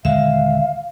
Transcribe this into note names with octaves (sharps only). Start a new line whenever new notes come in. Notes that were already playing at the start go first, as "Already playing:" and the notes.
D#1 D3 G#3 E5 F5